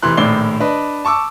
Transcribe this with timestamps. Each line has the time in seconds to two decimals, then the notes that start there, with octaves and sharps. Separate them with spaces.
0.03 F1 C3 E3 C6 F#6
0.17 A#1 A2 D#3 D5 C7 G7
0.60 D4 B4 D#5
1.05 A5 C#6 D6 E6